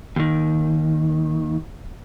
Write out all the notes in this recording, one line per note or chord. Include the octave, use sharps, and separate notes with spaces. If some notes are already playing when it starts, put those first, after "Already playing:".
D#2 D#3